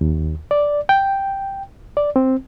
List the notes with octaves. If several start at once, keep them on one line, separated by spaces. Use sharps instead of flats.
D#2
D5
G5
D5
C4